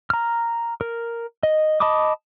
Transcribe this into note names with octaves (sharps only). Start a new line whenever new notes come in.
A#5 F6
A#4
D#5
D#5 A5 B5 D6 D#6